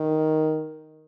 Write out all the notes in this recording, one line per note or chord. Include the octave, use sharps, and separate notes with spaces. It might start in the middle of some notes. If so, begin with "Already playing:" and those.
Already playing: D#3